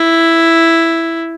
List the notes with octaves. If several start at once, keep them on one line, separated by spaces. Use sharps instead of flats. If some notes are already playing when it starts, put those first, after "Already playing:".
Already playing: E4